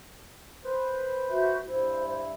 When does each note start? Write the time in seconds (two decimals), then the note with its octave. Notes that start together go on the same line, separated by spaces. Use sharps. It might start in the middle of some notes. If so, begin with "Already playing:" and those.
0.64 B4 C5
1.30 F#4 E5 G6
1.67 G2 E4 C5